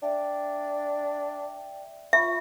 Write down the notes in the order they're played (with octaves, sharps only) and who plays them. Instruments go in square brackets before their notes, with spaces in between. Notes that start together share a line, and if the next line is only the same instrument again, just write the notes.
[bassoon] D4 [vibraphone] D5 E5 G5
[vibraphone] F4 B5 C#6 [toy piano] E5